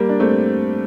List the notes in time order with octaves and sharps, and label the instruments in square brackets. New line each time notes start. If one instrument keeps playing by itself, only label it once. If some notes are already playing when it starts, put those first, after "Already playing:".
Already playing: [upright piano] G3 A#3
D4
A3 C4